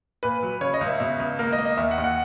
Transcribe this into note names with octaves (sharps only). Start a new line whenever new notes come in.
A#2 B4
F#3
C#3 C#5
D#5
C#2
E5
B2 E5
C#2
A#3 A#4
D#5
A#3
D#5
D#2 E5
F#5
D#2
F#5